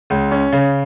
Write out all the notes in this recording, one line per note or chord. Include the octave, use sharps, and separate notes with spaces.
C#2
C#4
C#3